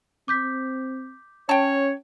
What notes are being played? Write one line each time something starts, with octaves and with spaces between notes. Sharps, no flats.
C4 D6 G6 B6
C#4 C#5 G5 A5